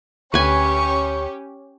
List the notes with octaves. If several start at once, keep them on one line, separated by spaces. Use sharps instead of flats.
D2 C#4 G4 B4 G#5 C#6